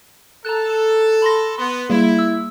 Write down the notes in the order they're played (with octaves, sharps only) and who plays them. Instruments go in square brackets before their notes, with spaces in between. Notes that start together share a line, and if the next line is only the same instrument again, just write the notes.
[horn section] A4 [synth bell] A#5 F#6
[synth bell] B5 C6 A#6
[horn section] B3 [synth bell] C6
[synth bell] G3 A#3 G#4 [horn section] E4
[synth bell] E6